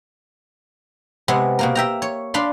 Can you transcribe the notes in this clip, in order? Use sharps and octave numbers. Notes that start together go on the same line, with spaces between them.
C3 G#3 B3
B2 A#3 A#4
E5 G5 A#5
C#5
D4 F5 B5 C6